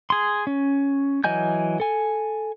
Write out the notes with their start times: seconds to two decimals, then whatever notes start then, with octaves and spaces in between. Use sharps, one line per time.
0.10 G#4 C6
0.47 C#4
1.24 E3 F#3 D#5 G#5 G6
1.80 A4 G#5